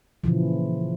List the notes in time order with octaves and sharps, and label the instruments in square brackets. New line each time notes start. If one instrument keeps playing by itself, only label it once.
[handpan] A#2 C#3 E3 F3